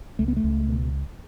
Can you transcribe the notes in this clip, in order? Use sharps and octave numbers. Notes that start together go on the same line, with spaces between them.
C#2 A3
B3
A3
C#2
B2